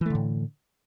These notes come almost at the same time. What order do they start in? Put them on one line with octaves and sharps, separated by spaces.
E3 A3 D3 A2